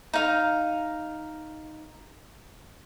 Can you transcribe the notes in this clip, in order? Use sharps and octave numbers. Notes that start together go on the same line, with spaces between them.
D#4 F5